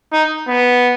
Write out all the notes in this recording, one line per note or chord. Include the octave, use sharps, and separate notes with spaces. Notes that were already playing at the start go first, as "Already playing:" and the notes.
D#4
B3